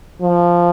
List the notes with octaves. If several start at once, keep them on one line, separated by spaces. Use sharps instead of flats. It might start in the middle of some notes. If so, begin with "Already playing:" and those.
F3